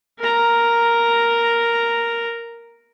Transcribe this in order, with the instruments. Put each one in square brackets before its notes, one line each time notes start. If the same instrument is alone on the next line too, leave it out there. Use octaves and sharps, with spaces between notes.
[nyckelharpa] A#4 A#5